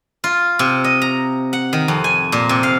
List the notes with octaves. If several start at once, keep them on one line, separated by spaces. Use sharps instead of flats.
F4
C3
D#5
A#5
F#5
D#3
F2
G#5
A#2
C3
F5